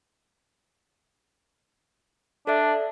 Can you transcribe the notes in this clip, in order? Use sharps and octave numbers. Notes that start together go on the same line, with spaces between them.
D4 A4 D5 E5